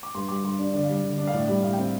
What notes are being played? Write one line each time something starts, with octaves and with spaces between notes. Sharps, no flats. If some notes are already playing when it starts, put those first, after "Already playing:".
D6
G2 C6
G3 D6
G2 C6
D4 D5
D3 D5
F5
G3 D5
D3
D4
F5
A2 D5
G3 D5
A2 F5
G5
C4
F5